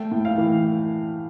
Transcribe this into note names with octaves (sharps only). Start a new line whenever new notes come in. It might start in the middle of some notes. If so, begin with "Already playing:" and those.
Already playing: A3 G5
A2
F5
E3